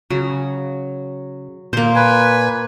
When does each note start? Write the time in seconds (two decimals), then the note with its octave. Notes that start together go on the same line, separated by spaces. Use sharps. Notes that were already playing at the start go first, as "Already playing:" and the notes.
0.10 C#3 F#3
1.73 A#2 A#3 C5
1.96 B4 G#5